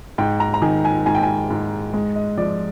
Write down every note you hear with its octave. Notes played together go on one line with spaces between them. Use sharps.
G#2 G5
A#5
A#5
D#3 G#5
G#5
G#2 G#5
G5
G#5
G#2
G#3
D#5
F3 D5